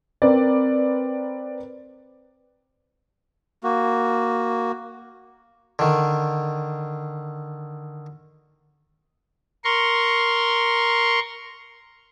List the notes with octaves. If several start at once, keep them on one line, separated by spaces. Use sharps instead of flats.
C4 A#4 B4 D5
A#3 F#4
D3 D#3
A#4 C6 C#6